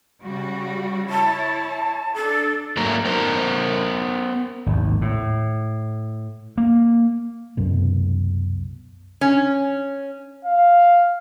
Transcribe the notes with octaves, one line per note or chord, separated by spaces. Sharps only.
C#3 G3 F#4
E4 C#5 A5
D4 A4
G#2 F#3 A3 A#3 A#5
B3 A#4 C5 A#5
G#1 D#2
A2
A#3
C2 F#2 B2
C#4
F5